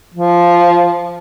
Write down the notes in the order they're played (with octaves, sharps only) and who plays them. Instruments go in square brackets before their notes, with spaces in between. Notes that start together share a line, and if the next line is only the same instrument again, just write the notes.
[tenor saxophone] F3